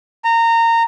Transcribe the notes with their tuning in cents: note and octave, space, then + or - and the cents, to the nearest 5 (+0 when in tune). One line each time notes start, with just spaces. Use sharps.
A#5 -20